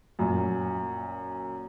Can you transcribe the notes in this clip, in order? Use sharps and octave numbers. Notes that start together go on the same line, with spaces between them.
F#2 A#2